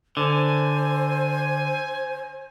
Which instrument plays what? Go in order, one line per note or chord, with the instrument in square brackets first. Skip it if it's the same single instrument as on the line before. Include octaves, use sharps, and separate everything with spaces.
[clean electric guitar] D3 [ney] C5 [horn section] G#5